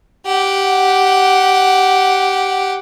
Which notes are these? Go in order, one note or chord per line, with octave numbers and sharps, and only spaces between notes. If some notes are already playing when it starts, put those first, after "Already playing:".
G4 F#5